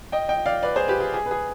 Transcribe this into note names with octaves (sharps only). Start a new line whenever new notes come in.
D#5 G5
D#5 G5
D5 F5
B4 D5
G#4 C5
G4 B4
G#4
G#4
B4
G#4